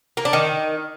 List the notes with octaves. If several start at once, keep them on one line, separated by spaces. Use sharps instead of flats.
A#3
D4
D#3